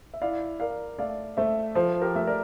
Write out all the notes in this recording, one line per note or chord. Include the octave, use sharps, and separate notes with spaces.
E5
E4 D5 F5
A#4 D5 F5
A3 D5 F5
A3 C5 E5
F3 A4 C5
G4 A#4
A3 E5
A#4 D5